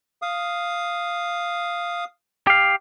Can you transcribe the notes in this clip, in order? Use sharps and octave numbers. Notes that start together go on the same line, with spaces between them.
F5 D#6
G4 F5